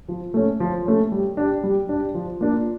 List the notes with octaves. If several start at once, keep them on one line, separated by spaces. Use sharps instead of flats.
F3
A3 C#4
F3
A3 C#4
G3
D4 G4
G3
D4 G4
F3
A#3 D4 F4